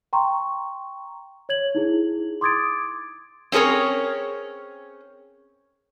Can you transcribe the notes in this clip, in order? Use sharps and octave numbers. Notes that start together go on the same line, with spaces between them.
G5 A#5 C6 C#6
C#5 G#6 F#7
D#4 E4 G#4
C6 D6 D#6 G#6 A6 D7
C4 C#4 G#4 A#4 C#5